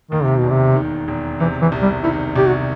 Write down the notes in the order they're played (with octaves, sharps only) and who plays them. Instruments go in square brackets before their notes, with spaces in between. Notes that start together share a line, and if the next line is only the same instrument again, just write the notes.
[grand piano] D#2 [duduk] D#3
[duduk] C3
B2
[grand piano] E1
[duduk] C3
[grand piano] D#3
E1
[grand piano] C3 [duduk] E3
[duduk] E3
[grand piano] C2
[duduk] G3
[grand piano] D#3 [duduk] E4
[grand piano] C2 [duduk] G4
[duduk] F#4